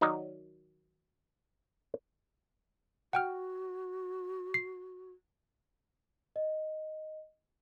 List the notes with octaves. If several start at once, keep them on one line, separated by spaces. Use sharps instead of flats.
D#3 F#3 D#4 A#4 D5 D#5
F#4 F#5 G5 F6
C7
D#5